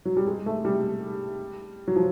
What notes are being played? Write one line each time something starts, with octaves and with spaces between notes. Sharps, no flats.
F#3
G3
G#3
A3
G3
F#3
F3